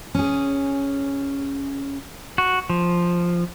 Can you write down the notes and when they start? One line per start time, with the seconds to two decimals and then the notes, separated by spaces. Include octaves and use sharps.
0.15 C#4 G#4
2.38 F#4
2.70 F3